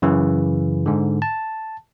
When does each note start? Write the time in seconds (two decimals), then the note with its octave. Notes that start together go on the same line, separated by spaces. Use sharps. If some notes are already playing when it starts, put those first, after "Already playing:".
0.02 F#2 C#3 E3
0.86 G#2 D3
1.22 A5